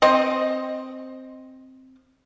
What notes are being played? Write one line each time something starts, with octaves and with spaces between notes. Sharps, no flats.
C4 D#5